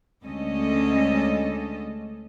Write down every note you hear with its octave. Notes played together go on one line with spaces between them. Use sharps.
D2 D3 G#3 C#4 A4 D#5